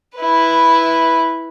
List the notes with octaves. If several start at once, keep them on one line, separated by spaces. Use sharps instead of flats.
E4 B4